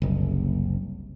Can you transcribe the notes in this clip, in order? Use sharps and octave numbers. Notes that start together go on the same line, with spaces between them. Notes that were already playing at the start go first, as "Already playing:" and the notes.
F#1 C2